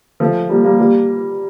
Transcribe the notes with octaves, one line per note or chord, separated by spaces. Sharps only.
F3 A3
G3 A#3
G3 A#3
G3 A#3